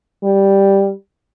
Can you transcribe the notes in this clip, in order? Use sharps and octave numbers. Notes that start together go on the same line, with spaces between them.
G3